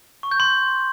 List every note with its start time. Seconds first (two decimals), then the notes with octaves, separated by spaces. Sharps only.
0.23 C#6
0.31 G6
0.40 C6